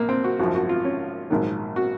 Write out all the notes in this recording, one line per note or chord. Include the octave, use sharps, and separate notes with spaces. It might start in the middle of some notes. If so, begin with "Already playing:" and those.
Already playing: A#1 A#3
C4
F#4
G#1 F#2 F3 F#4
F#4
F4
C#4
A#1 G#2 D#3 F#3
F#4